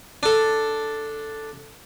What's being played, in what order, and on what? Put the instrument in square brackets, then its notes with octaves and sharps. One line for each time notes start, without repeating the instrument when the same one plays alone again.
[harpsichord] D4 A4